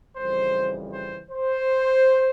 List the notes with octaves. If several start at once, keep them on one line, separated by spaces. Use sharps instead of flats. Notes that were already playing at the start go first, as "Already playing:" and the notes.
F2 C#3 E3 G3 C5
C5
C5